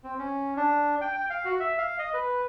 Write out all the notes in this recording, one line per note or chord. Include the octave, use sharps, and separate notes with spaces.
C4
C#4
D4
G5
G5
F5
F#4
E5
F5
D#5
B4